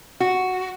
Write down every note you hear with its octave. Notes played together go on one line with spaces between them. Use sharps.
F#4